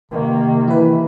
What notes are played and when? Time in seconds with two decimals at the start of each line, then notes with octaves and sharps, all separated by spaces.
0.11 C3 D#3 A#3
0.68 E3 E4 B4